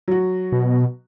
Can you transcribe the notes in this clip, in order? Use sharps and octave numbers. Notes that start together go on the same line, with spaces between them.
F#3 F#4
B2